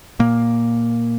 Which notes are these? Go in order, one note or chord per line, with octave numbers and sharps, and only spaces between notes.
A#2 A#3